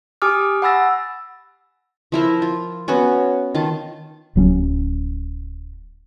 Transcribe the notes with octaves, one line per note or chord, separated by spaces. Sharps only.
G4 G#5 D6 D#6 F6
F#5 G#5 B5 E6 A6 A#6
F3 E4 A#4 C5
F4
B3 C#4 F#4
D#3 F4 A5
D1 F#3 C4 C#4